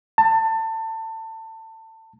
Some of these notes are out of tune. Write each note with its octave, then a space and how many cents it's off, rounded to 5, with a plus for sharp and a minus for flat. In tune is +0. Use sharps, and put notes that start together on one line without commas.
A5 +25